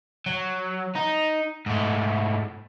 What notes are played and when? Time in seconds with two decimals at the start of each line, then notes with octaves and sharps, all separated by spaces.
0.26 F#3
0.95 D#4
1.66 G#2 A3